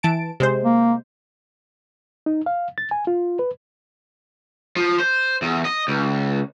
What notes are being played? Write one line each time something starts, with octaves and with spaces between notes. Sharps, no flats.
E3 A5 D7
C3 G#3 C5
A#3
D#4
F5
A6
G#5
F4
B4
F3
C5
E2
D#5
C#2